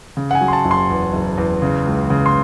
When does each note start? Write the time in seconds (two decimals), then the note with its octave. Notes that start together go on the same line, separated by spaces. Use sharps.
0.17 C#3
0.31 F#5
0.35 G#5
0.41 F#3
0.48 C6
0.53 A5
0.65 F#1
0.71 C6
0.90 E2
1.13 F#1
1.38 E2
1.62 C#3
1.86 C#2
2.10 C#3
2.26 C6